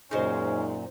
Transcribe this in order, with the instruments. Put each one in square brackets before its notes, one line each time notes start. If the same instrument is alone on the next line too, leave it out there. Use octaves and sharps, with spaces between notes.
[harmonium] F#2 A#2 [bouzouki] C#3 G#3 [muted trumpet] C#4 [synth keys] D#4 F#4 C5